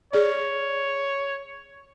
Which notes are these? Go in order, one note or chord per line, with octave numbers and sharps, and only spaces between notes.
G#4 C#5 D5